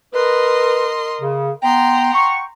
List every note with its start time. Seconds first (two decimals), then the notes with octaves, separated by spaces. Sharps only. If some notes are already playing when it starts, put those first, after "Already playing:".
0.14 A#4 B4 D#5 C6
1.20 C#3
1.62 B3 G5 A#5 C6
2.13 F#5 G5 C#6